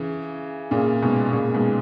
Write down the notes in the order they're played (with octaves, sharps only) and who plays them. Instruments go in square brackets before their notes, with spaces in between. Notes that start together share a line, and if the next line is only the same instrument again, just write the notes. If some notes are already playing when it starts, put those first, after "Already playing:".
Already playing: [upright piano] C#3 E3
A#2 C#3
G#2 B2
A#2 C#3
G#2 B2